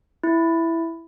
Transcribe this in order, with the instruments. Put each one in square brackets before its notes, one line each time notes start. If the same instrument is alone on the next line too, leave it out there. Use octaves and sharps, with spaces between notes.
[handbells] E4